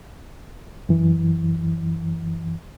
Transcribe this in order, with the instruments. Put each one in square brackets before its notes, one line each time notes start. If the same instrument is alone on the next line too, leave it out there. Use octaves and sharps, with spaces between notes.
[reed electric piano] F#2 E3